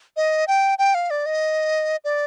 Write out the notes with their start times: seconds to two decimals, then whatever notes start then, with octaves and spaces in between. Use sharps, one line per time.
0.17 D#5
0.48 G5
0.79 G5
0.95 F5
1.10 D5
1.26 D#5
2.04 D5